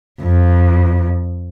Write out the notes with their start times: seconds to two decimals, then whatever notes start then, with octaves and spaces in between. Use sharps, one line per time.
0.22 F2